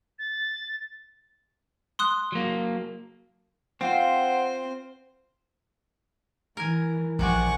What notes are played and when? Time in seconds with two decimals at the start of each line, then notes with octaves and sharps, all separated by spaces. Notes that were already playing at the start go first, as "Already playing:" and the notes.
0.19 A6
1.99 C6 D#6 F#6
2.32 F#3 A#3
3.81 C4 F4 C5 F#5
6.57 E3 A#4 G#5
7.19 A#1 C3 F#4 D5 F#5 G#5 C#6